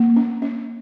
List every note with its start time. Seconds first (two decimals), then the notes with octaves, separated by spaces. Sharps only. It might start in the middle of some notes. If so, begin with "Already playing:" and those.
Already playing: A#3
0.16 C#4
0.42 C#4